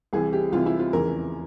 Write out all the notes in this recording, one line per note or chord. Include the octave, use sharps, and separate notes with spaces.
C2 C3 E3 G#4
G4
C2 C3 E3 F4
E4
F4
F1 E2 C#3 E3 A#4